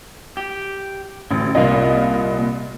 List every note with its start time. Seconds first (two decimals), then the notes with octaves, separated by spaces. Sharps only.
0.37 G4
1.31 A1 D2
1.55 C2 A#2 A#3 F4 D#5